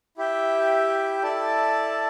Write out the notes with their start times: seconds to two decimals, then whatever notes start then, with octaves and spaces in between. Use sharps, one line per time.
0.17 E4 G4 E5 G5
1.22 E4 A4 D5 A5